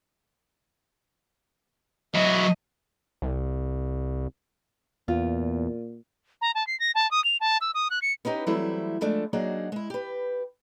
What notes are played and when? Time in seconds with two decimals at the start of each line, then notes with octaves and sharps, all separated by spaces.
2.15 F#3 E4 D#5
3.22 C2
5.08 E2 A#2 F4
6.41 A#5
6.55 A5
6.67 C7
6.80 A#6
6.95 A5
7.11 D#6
7.24 F7
7.40 A5
7.61 E6
7.74 D#6
7.90 F#6
8.02 C#7
8.25 B3 C#4 D#4 G4
8.46 E3 F#3 G3 A3 C4 E4
9.01 F3 G#3 A3 D4
9.33 F#3 A#3 D4 D#4 F#4 G#4
9.72 G#3 E4
9.90 G4 B4